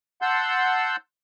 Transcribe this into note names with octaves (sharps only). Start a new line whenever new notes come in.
F#5 A5 C6 E6 G6